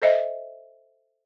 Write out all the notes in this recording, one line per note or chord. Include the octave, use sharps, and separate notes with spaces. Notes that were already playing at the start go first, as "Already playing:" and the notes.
A4 C5 D#5 E5